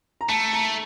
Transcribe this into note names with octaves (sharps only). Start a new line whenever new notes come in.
A#5
A3 A5
A#5